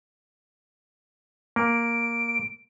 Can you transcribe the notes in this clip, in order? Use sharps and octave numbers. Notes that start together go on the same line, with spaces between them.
A#3 D7